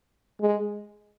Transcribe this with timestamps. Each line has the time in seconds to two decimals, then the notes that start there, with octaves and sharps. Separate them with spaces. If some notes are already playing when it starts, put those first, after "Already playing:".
0.41 G#3